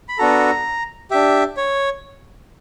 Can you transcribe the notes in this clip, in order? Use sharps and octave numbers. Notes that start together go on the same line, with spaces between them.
B5
B3 D4 F#4 A4 A#5
D4 G4 E5
C#5